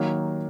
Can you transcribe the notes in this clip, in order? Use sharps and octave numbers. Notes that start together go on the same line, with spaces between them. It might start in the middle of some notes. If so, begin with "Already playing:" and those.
Already playing: D#3 F#3 A#3